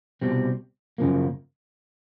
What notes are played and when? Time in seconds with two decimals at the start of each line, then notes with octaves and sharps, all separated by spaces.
0.22 C2 B2 G3 C4
0.98 F#2 C#3 F3 A#3